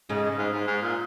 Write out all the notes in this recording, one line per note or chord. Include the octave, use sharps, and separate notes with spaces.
G#2 C#3 G#3
G#2
G#2
G#2
A#2